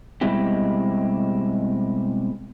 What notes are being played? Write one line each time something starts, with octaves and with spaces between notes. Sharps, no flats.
B2 G3 G#3 C4 E4 G4